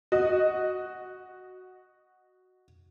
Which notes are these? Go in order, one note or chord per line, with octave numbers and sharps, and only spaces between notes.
F#4 D#5